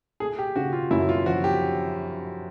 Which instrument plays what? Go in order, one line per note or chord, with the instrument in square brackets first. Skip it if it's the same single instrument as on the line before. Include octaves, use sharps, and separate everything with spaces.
[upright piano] A3 [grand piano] G#4
[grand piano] G4
[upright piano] C#3 [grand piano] F#4
[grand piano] F4
[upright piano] F#2 [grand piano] E4
[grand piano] F4
[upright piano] F3 [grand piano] F#4
[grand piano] G4